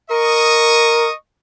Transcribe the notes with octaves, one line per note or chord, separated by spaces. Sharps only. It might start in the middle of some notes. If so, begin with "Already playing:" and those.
A#4 D#5 C#6 D#6